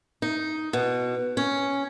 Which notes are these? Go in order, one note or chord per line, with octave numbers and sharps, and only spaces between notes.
D#4
B2
C#4